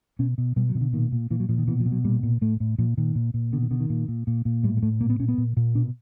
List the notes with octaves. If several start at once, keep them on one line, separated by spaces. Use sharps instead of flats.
B2 C#4
B2
B2 G3
F#3
B2 D#3
D3
A#2 D#3
A#2
A#2 E3
F#3
A#2 F3
D#3
B2 E3
F3
B2
F#3
A#2 G3
A#2
A2 A3
A2
A#2 F3
A#2 D#3
A#2
A#2
B2 D3
D#3
B2 D3
D#3
A#2
A#2
A#2
A#2
A2 G3
G#3
A2 A3
A#2 A#3
B3
A#2 C#4
B3
A#2
A#2
B2 D4